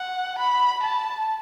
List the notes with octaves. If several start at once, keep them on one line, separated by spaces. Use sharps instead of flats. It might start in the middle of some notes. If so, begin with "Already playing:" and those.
Already playing: F#5
B5
A5